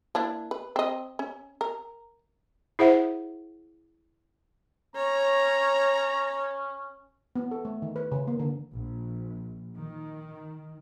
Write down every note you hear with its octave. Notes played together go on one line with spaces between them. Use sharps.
A#3 D4 E4
B4
C4 D#5
C#4
A#4
E4 G#4 C5 E5 F#5
C#4 C#5 A#5
B3
A4
A3
D#3
B4
C#3
A#3
D3
A#1
D#3